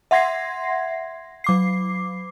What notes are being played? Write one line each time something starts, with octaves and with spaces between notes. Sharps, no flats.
E5 F#5 C6 G#6 A#6 C7
F#3 D6 C7